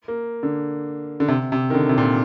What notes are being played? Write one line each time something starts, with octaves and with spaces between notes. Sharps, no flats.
A#3
D3
D3
C3
C3
D#3
D3
C3
A#2